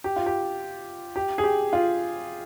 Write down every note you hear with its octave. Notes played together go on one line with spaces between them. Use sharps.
G4
F4
G4
G4
G#4
G4
F4